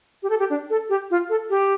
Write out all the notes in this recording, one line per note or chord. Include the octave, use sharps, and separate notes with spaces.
G4
A4
G4
D4
A4
G4
F4
A4
G4